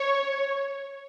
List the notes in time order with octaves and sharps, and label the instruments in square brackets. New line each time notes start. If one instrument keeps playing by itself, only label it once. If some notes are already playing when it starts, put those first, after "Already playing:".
Already playing: [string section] C#5